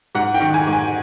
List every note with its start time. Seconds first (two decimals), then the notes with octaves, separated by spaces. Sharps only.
0.15 G#2 F#5
0.34 G5
0.40 D#3
0.54 G#5
0.67 G#2
0.73 G#5